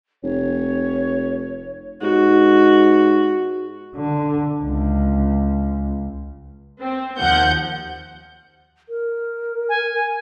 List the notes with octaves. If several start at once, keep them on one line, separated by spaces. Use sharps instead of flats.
F1 C#5
G#2 F#4
D3
C#2
C4
D#2 F3 F#5 G6
A#4
G#5